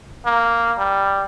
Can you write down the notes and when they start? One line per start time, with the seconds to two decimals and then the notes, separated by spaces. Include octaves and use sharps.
0.25 A#3
0.78 G3